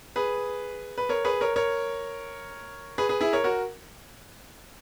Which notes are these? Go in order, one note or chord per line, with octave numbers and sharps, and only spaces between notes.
G#4 B4
B4
A#4 C#5
G#4 B4
A#4 C#5
A#4 C#5
G#4 B4
G#4 B4
E4 G#4
A#4 C#5
F#4 A#4